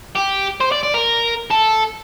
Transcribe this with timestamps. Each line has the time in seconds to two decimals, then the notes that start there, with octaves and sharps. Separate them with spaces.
0.15 G4
0.61 C5
0.72 D5
0.83 D5
0.94 A#4
1.50 A4